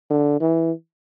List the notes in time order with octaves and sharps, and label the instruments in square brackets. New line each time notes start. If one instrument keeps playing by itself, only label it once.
[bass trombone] D3
E3